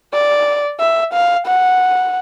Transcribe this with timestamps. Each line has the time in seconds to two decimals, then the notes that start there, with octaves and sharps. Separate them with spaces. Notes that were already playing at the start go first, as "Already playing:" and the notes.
0.14 D5
0.80 E5
1.13 F5
1.47 F#5